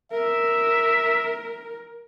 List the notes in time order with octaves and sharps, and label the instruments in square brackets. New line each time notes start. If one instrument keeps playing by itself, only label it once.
[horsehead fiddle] A#4 [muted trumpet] E5